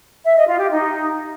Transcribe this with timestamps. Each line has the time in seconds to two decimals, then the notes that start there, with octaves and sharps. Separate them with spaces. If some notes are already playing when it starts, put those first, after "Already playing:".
0.25 E5
0.36 D#5
0.48 F4
0.59 G4
0.70 D#4